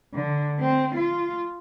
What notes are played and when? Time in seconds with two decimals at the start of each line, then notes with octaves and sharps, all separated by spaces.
0.15 D3
0.60 C4
0.95 F4